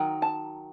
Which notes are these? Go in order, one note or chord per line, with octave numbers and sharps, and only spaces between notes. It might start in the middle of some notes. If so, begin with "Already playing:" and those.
Already playing: D#3 F#3
A5